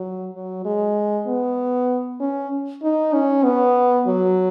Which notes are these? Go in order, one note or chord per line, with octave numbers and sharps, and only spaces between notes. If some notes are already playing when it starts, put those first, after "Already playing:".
Already playing: F#3
F#3
G#3
B3
C#4
D#4
C#4
B3
F#3